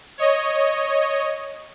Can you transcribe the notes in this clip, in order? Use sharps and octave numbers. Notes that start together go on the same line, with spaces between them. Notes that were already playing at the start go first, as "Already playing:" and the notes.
C#5 D#5